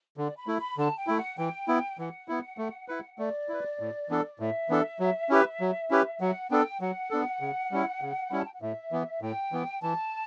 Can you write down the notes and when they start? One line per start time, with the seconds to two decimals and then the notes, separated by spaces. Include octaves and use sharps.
0.17 D3 D5
0.37 B5
0.47 A3 E4
0.57 B5
0.78 D3 A5
0.97 G5
1.07 A3 E4
1.18 F#5
1.37 E3 G5
1.68 B3 E4
1.98 E3 F#5
2.28 B3 E4
2.58 A3
2.88 E4 B4
3.19 A3 D5
3.49 E4 B4
3.80 A2
4.09 E3 B3 D4 A4
4.40 A2 E5
4.69 E3 B3 D4 A4
5.00 F#3
5.30 C#4 E4 G4 B4
5.60 F#3
5.91 C#4 E4 G4 B4
6.20 F#3 F#5
6.51 B3 D4 A4 G5
6.80 F#3 F#5
7.10 B3 D4 A4
7.41 C#3
7.71 G3 C#4 E4
8.02 C#3
8.30 G3 C#4 E4 B5
8.38 A5
8.45 G5
8.54 F#5
8.61 A2 E5
8.92 E3 B3
9.22 A2 G5
9.52 E3 B3
9.83 E3 A5